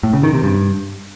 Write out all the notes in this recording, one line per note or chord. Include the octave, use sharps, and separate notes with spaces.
A2
C#3
D#3
C3
G2